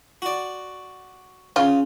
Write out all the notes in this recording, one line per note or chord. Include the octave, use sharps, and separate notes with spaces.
F#4 D5
C#3 F4